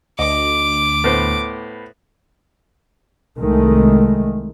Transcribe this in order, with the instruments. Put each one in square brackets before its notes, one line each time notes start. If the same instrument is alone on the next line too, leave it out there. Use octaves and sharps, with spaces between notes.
[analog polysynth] D2 [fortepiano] D#5 [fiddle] D6
[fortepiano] A2 B3 C5
[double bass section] C2 D#3 G#3 A3